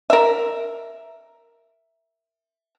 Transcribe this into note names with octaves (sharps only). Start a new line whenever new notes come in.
A#4 E5